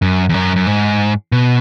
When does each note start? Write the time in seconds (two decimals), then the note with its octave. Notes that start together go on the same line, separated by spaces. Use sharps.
0.02 F#2
0.29 E2
0.34 F#2
0.56 F#2
0.67 G#2
1.32 B2